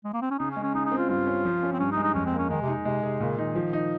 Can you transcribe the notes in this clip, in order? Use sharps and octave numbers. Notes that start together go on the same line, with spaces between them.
G#3
A#3
C4
C#4
C#3 D#4
C#4
G#3
C#4
C#3 D#4
D#4
C4
F4
G2 F4
C#4
F3
C#4
C4
G2 C#4
D#4
G#3
D#4
F2 C#4
C4
A#3
C#4
D#3 G#3
C3
D#4
C3 G#3
C3 G#4
A#2 C#3
D#3 D#4
F3
D#4